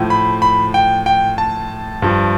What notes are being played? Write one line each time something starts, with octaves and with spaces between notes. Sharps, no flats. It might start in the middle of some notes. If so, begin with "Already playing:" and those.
Already playing: A2 F3
B5
B5
G5
G5
A5
G2 F3